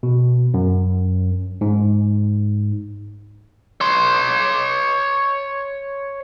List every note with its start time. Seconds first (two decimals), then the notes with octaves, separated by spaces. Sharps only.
0.03 B2
0.54 F#2
1.61 G#2
3.81 C#5 C6